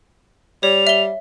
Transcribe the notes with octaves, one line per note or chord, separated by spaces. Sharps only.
G3 C#5 F7
E5 G7